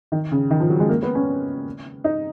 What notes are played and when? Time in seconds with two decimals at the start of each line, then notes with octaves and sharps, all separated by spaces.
0.12 D#3
0.31 C#3
0.50 D#3
0.60 F3
0.69 F#3
0.80 G#3
0.89 A#3
1.03 B3
1.15 C#4
2.04 D#4